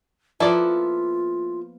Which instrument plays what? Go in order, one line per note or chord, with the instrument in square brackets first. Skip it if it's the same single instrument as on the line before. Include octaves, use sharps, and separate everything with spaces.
[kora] F3 A#3 B3 [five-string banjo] E4 A4 D5 [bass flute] F4